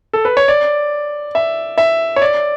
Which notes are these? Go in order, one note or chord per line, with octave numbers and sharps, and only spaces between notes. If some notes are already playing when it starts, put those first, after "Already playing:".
A4
B4
C#5
D5
E5
E5
C#5
D5